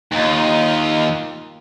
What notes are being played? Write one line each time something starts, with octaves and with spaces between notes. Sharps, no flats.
D#2 D#4 F4